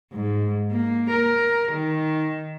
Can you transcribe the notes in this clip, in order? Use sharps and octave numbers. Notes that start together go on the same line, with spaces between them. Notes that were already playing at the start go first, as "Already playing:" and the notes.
G#2
A#3
A#4
D#3